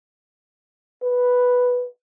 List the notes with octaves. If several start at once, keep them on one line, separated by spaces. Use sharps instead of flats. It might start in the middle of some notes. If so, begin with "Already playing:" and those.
B4